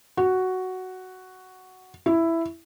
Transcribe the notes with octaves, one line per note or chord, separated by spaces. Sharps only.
F#4
E4